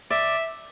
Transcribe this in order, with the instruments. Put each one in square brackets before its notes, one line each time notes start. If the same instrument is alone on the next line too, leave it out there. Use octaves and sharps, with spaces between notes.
[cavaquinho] D5 [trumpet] E5